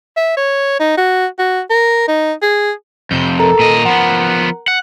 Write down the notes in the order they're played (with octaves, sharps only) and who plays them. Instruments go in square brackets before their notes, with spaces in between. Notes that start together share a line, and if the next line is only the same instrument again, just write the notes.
[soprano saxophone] E5
C#5
D#4
F#4
F#4
A#4
D#4
G#4
[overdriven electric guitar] F2 C3 [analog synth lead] G6
[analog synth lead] A4 [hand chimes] A#4 A#5
[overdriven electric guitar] A#2 D#5
[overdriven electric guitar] F3 B3 [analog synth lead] F#5
[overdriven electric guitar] F#5 [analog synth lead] F#6